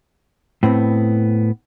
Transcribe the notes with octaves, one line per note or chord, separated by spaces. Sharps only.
A2 B3 C4